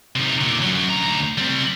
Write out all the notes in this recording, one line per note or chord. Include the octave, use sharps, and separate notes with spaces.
C3 D#4
A#2 D3
F#2 F#3
D2 A#5
G3 C4